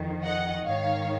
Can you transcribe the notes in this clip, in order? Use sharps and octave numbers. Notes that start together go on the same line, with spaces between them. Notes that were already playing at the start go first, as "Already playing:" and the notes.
Already playing: F2 D#3
D#5 F#5
G#2 D#3 C#5 F5